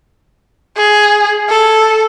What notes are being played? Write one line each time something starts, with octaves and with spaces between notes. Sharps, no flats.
G#4
A4